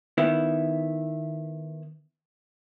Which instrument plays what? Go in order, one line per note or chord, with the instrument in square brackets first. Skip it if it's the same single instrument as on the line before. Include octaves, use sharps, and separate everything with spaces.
[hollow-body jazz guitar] D#3 B3 E4